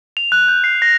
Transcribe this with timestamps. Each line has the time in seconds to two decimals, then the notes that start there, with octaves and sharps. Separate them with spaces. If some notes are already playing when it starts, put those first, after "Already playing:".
0.17 F7
0.32 F#6
0.48 G6
0.64 C7
0.82 A#6